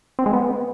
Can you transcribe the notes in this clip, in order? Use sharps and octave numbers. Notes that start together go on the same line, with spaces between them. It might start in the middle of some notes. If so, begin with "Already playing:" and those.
C4
G#3
B3